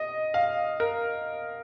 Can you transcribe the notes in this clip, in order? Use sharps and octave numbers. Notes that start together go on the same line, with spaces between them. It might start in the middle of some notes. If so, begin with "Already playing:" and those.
Already playing: D#5
F5
A#4